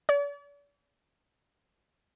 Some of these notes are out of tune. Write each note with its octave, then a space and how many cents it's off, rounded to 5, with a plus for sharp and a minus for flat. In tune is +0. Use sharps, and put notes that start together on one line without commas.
D5 -45